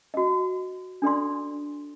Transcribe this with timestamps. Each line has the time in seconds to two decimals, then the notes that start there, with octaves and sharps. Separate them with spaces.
0.14 F#4 D#5
1.02 D4 A4 D5 C6